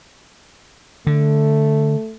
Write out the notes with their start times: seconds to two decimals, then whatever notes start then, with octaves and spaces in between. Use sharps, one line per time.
1.07 D3 A3